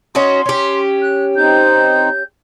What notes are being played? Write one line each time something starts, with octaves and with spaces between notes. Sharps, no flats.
C#4 D#4 F#4 C6
C#4 G4
F#6
C4 D#4 G6